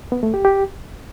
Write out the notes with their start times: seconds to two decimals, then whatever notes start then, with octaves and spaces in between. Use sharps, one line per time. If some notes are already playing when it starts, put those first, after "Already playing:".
0.12 B3
0.23 A3
0.34 G4
0.45 G4